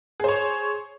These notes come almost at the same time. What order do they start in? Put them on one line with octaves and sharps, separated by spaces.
G#4 C5 C#5